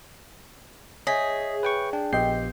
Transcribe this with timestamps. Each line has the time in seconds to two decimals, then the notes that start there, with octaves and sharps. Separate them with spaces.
1.07 G#4 C#5 D#5 E5 B6
1.63 B4 G5 C#6
1.93 D4 G5
2.13 A#1 B3 G4 D#5 G5 G6 C7